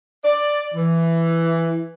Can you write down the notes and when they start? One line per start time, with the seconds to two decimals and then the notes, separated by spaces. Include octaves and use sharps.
0.25 D5
0.75 E3